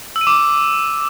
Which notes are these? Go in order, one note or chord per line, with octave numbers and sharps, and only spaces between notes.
E6
D#7
D6